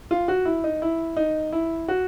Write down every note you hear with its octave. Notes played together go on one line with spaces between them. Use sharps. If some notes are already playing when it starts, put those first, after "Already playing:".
F4
F#4
E4
D#4
E4
D#4
E4
F#4